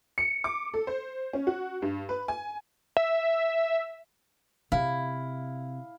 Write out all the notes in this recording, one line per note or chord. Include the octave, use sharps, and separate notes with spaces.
C#7
D6
A4
C5
C#4
F#4
G2
B4
G#5
E5
C3 E4 F5